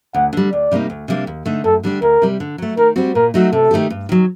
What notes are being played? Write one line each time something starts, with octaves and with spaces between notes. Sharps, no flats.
D2 F#5
D3 G3
D2 D5
C3 G3 A#3 D#4
D2
C3 G3 A#3 D4
D#2
D3 A3 D#4
F#2 A4
D3 G3 D4 G4
D2 A#4
C3 G3
D3
F#3 A3
D#3 A#4
G3 C4 F#4
A#2 A#4
F#3 A3 D#4 F#4
C3 A4
D#3 A3 D#4 G4
G2
D#3 F#3